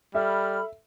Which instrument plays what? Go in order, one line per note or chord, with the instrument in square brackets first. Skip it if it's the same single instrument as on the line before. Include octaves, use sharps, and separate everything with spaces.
[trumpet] G3 [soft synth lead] A4 [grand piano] E5 [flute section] B5 F6